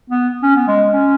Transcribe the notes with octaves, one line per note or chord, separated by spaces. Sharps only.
B3
C#4
B3
G#3
C#4